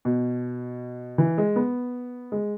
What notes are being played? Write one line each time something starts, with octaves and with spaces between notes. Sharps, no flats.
B2
E3
G#3
B3
G#3